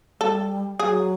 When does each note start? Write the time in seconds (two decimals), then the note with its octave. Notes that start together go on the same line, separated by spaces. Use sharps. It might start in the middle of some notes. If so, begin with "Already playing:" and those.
0.20 G3 A4
0.79 F#3 G#4